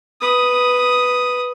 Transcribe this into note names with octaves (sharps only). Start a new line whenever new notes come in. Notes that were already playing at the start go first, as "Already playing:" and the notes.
B4 D#6